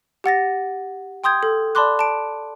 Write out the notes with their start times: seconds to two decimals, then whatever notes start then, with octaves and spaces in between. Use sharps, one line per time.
0.24 G4 F#5 A6 A#6
1.24 G5 C6 D#6 G6 G#6
1.43 A4
1.75 D5 A5 B5 C6 D6 F#6
1.99 A5 D7